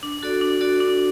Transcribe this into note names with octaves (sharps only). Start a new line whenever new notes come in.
D4
F#4 A4 D5
D4
F#4 A4 D5
D4